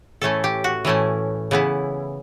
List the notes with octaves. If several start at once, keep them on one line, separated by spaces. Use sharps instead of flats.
A2 E3 A3 C#4 E4 A4
G4
F#4
A2 E3 A3 C#4 E4
C#3 E3 B3 E4